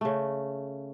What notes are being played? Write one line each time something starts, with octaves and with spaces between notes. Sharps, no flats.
C#3 A3